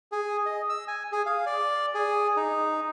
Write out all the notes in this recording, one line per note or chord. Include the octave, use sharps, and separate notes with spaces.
G#4
D#5
E6
G#5
G#4
F5
D5
G#4
D#4